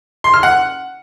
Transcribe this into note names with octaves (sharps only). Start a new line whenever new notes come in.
C6
F6
F#5